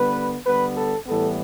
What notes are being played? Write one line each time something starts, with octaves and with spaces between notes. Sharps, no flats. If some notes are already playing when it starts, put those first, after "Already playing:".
Already playing: D3 G3 B3 B4
D3 G3 B3 B4
A4
A2 E3 G3 B3 A4